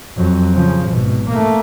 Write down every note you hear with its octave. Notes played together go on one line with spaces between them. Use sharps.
F2 F#3
C#3 F3
G#1 B2
A3 A#3